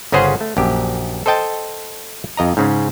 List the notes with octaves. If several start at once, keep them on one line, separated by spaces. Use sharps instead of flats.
G1 C#3 C#4 G#4 C5 F#5
A3
A#1 F#2 G4
A4 C5 D#5 G5 A5
F2 D#5 A#5
G#2 C#3 C#4